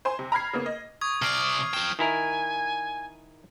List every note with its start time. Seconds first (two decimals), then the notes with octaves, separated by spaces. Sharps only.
0.05 C5 G#5 C6
0.19 C3
0.32 A#5 B5 F6 G#6 C7
0.53 C#3 A#3 B3
0.66 D#5
1.01 C#6 D#6 G#6
1.22 C3 D5 F6 C7
1.73 F3 G5 E7
1.99 D#3 E4 A#4 G#5